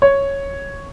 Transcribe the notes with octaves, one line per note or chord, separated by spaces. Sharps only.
C#5